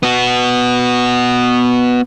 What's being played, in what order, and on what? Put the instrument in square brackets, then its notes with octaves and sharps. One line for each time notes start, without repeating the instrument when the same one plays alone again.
[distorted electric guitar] B3 F#4